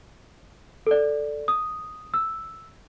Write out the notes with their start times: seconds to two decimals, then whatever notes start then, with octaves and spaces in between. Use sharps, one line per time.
0.87 A4 D5
1.48 D#6
2.14 E6